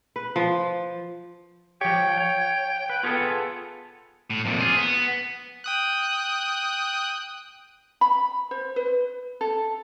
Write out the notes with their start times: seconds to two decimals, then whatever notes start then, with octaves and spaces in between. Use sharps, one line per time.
0.16 B4
0.36 F3
1.81 F3 C#5 G5
2.17 C#5
2.90 B4
3.03 B3 F4 G#4 A4
4.30 A2
4.45 F2 A#2
4.59 F4 G#4
4.77 B3
5.64 G5 D#6 F#6
8.01 B5
8.51 C5
8.76 B4
9.41 A4